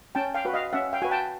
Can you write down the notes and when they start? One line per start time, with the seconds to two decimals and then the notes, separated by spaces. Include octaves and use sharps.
0.15 C#4 G5 A5
0.34 F5 G5
0.45 F#4 B4
0.54 D#5 F5
0.73 C#4 E5 F#5
0.93 F5 G5
1.02 F#4 B4 G#5
1.11 G5 A5